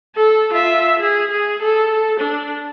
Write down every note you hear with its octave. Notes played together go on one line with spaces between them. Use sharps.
A4
F4 E5
G#4
G#4
A4
D4